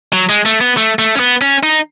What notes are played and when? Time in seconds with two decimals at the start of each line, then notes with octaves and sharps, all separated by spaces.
0.13 F#3
0.29 G#3
0.46 A3
0.61 B3
0.77 A3
0.99 A3
1.15 C#4
1.19 B3
1.41 C#4
1.63 D#4